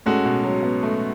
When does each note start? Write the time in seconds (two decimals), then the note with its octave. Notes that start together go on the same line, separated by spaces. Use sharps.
0.06 A2 G#3 C#4 F#4 A4
0.25 B2
0.44 F#3
0.63 B3
0.83 A3